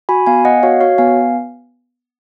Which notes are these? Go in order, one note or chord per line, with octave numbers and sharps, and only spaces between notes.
F#4 G#5 B5
B3 F5 G#5
B3 D#5 F#5
F#4 C#5 F5
F#4 C#5 F5
B3 F5 G#5